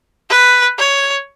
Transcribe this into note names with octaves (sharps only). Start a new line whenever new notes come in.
B4
C#5